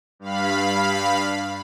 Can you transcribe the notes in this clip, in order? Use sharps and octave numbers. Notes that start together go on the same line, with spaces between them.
G2 F5 B5